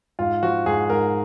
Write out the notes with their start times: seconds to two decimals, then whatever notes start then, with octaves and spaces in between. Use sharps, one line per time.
0.19 G#2 F4
0.43 F3 F#4
0.66 G#2 G#4
0.90 G#2 A#4